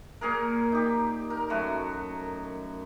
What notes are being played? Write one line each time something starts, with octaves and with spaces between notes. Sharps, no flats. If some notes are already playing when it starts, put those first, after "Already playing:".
A#2 G#4 A#4
D#4 G4
A#4
F#2 A3 F#4